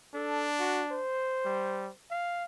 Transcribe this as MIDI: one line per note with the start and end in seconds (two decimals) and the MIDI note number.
0.14 1.02 62
0.14 0.48 69
0.60 0.82 66
0.91 1.93 72
1.45 1.90 55
2.11 2.44 77